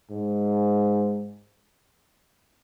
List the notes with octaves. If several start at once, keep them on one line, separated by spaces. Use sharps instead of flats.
G#2